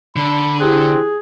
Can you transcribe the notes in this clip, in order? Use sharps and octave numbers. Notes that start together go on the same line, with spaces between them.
D3 B5
C4 E4 G4 G#4 F#6